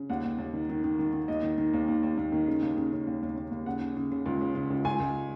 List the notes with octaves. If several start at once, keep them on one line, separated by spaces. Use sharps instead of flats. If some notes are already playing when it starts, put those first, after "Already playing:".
Already playing: C#3
D#2 F#5
D#2
D#2
D#3
D#3
D#3
D#3
D#3
D#2 D#5
D#3
D#3
D#2
D#2
D#2
D#2
D#3
C#3
D#2
C#3
C#3
D#2
D#2
D#2
D#2
C#3 F#5
C#3
C#3
C#3
C#2
C#3
C#3
C#2
C#2 G#5
C#2